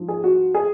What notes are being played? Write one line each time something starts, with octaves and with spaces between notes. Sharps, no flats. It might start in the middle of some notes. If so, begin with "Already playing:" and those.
Already playing: G#2 F3
G#4
F#4
G#4